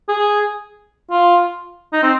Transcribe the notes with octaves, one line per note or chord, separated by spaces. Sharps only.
G#4
F4
D#4
C4